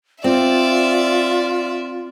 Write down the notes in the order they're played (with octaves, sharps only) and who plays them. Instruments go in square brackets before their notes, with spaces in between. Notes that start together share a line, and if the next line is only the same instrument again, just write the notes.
[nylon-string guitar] C4 [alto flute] F4 [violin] D5 E5